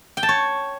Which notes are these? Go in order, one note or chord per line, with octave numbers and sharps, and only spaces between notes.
G5
A5
C#5